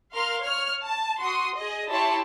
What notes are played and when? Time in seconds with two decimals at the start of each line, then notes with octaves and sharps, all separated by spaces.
0.12 A#4 F5 C6 F6
0.42 C#5 F6
0.82 A5
1.20 F#4 C6 D#6
1.56 G#4 D#5
1.89 E4 G4 C#5 A5 C6 C#6